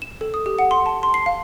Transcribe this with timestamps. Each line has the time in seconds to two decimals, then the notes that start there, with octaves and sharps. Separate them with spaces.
0.02 E7
0.21 A4
0.34 D#6
0.46 G4
0.59 F#5
0.71 C6
0.86 A5
1.03 C6
1.14 C7
1.26 F5